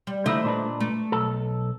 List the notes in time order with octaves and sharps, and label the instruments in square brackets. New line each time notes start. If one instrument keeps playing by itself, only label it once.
[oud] G3
[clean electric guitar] D3 D#3 E4 [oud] A3 C5 D#5
[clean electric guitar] A#2 D4 B4
[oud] A3
[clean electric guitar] B1 A4